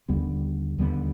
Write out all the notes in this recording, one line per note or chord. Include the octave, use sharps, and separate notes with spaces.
D#2 D3 G3 B3
D#2 D3 G3 B3